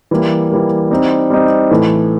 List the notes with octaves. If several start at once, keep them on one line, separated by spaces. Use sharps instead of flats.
E3 G3 A#3
E3 G3 A#3
G3 C4 D#4
G3 C4 D#4
A2 E3 A3